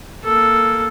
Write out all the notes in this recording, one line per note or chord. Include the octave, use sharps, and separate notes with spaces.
A#3 A4